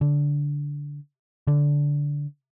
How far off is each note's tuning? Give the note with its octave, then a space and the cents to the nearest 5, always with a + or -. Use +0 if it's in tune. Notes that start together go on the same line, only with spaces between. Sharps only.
D3 -15
D3 -15